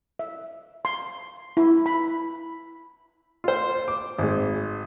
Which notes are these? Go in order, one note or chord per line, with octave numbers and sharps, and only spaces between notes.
E5
C6
E4
B5
F4 C5
D6
G#1 G#3